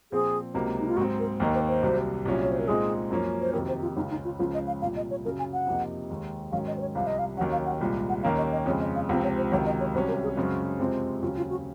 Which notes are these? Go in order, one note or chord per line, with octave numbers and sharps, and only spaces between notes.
A#2 F3 C4 G#4
C#2 C3 F#3 A#3 D#4
D#4
F4
G#2 F#3 C4 F#4
A#4
D#2 D#3 A#3 D#4
C5
C5
C2 C3 F#3
C2 A#2 F#3 C#4
C#5
C5
A#4
A#2 G#3 C4 D#4 G#4
F#2 F3 A#3 C#4
C5
F2 C3 D#3 F#3 A#4
C5
F4
C#2 C#3 G#3 D#4
D#4
F4
C#2 C#3 F3 F4
D#5
F5
C2 A#2 F3 F5
D#5
C#5
F#2 C#3 F#3 A#4
G#5
F#5
F2 C3 F3 A#3 D#4
D#2 D#3 G#3
G#2 D#3 F#3 C#4 F5
D#5
C5
C#5
C2 C3 F3 F5
D#5
F5
D#2 D#3 F#3 C#4 F#5
F5
F#5
C2 A#2 G#3
F#5
D#2 D#3 A#3 C#4 F5
D#5
D#5
F2 C#3 G#3 C#5
D#5
F5
C#2 C3 F3 C4
C#5
C5
C#2 C3 D#3 F#3 C#5
D#5
C#5
C2 C3 F#3 C#4 C5
A#4
G#4
F#2 C#3 G#3 C4 F#4
F2 C3 F3 G#3 C4
D#2 C#3 F#3 C#4 F4
F4
F#4